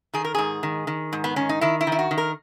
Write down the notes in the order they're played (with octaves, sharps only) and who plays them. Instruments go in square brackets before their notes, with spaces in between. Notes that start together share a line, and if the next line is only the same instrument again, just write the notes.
[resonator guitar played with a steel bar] D#3 G#4
A#4
G#2 G#4
D#3
D#3
G#2
B3
D#3 C#4
D#4
D#3 E4
E4
D#3
E4
F#4
D#3
A#4